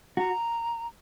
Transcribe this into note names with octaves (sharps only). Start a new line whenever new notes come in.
F#4 A#5